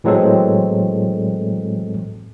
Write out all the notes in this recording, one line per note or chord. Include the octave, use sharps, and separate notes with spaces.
A2 E3 F#3 G#3 C4 A4